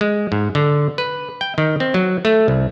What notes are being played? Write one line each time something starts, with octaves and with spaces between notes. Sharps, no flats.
G#3
G#2
D3
B4
G5
D#3
C4
F#3
A3
C2